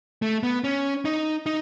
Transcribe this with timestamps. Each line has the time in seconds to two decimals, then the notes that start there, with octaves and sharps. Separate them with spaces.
0.22 A3
0.43 B3
0.64 C#4
1.05 D#4
1.46 D#4